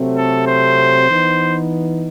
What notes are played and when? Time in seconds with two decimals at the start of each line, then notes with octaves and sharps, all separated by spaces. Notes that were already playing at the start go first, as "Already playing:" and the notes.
Already playing: C3 F#3 A3 C4
0.17 A4
0.48 C5
1.09 E3 B3 D#4